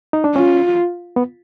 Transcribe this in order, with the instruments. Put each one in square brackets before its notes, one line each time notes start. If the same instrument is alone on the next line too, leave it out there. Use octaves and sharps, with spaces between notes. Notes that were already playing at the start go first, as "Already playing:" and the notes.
[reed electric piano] D#4
D4
[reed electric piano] C#4 [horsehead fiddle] F4
[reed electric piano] B3